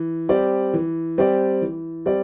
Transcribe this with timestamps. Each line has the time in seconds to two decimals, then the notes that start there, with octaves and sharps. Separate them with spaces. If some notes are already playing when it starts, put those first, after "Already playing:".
Already playing: E3
0.29 G3 C4 G4 D5
0.74 E3
1.18 G3 C4 G4 D5
1.62 E3
2.06 G3 C4 G4 D5